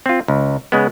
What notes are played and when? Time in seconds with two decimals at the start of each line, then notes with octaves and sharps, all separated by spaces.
0.06 C4 F4
0.28 C#2
0.72 C#3 G#3 B3